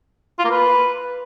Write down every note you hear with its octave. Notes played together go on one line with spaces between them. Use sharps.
F4
A#3
B4